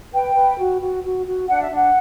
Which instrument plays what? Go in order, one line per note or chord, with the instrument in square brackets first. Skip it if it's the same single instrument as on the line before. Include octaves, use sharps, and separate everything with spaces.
[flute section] B4 G5
B4
F#4
F#4
F#4
F#4
D4 F#5
E5
D4 F#5